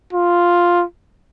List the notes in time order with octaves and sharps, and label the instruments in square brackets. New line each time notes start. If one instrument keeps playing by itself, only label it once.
[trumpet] F4